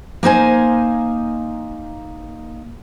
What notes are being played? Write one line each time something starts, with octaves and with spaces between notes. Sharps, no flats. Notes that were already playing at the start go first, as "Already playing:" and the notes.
A#3 D#4 C5 G#5